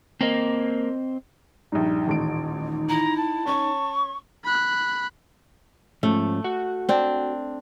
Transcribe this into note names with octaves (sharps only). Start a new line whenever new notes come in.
A#3 C4 C5 D#5
A#1 G2 D#4
D#1 A1 D7
E4 A#5
A5
C#4 C#5 C#6
B5 F#6
G#2 F3 A3 C#4
F#4 F#5
C4 D4